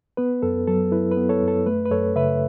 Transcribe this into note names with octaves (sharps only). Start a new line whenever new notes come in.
B3 B4
F#2 A4
F#3 A4
E4 B4
B4
B3
A4 C#5
F#2
A4
A3 B4
B4
F#2 A4 C#5
C#3 B4 E5